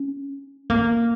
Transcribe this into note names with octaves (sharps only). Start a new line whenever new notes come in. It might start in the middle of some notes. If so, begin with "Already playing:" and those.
Already playing: C#4
A#3